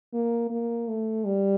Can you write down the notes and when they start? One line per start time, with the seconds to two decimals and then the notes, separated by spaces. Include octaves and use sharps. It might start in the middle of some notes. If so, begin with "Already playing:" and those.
0.13 A#3
0.51 A#3
0.88 A3
1.26 G3